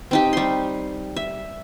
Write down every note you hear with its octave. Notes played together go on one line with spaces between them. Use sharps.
C4 D#4 G4
G3 C6
E5